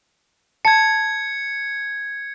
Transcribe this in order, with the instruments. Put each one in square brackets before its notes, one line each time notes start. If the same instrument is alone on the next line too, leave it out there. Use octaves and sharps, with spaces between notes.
[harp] A5 [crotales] G#6 C#7